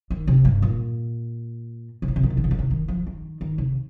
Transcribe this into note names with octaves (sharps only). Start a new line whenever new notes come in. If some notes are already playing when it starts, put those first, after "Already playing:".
D#3
C3
G2
A#2
C3
D#3
C3
D#3
C3
D#3
C3
D#3
C3
D#3
F3
D#3
D#3
C3